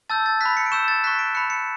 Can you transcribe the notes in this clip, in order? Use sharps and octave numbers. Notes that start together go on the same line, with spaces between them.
A5 E6 G6 A6
A6
B5 F#6 B6
C#7
D7
C#6 E6 G6 E7
A6
C#6 F#6 B6
D7
B5 F#6 C#7
C#7